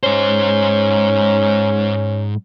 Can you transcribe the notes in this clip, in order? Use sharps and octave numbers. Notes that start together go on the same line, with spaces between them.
G#2 C#4 C5